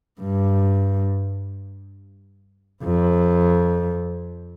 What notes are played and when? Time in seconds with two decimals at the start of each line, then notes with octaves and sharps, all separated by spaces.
0.21 G2
2.83 F2